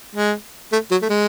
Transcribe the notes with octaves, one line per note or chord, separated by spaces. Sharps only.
G#3
A3
F#3
A3
G#3